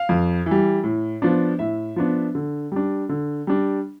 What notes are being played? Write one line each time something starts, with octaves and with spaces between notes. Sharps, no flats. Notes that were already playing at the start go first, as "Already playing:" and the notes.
Already playing: F5
F2
E3
G3
A2
F3 B3 D4
A2 E5
F3 B3 D4
D3
G3 D4
D3
G3 D4